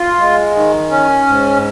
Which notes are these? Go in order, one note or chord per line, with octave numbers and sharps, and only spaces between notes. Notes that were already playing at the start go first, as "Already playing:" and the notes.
Already playing: F4
G#3
D#3
C#4
G#2